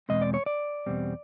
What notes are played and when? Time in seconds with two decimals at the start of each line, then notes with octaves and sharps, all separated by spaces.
0.09 E2 B2 G#3 C4 D#5
0.22 D5
0.34 C#5
0.46 D5
0.86 E2 B2 G3 C4